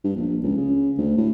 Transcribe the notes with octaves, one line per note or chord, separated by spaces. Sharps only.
G2
A#1
C#2
C#3
D2
A2